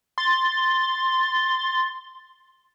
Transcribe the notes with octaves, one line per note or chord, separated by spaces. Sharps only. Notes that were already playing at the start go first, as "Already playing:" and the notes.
C6 A6